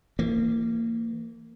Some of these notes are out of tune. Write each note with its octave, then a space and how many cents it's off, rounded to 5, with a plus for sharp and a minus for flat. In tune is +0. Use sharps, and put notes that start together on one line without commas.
E3 +25 A#3 -25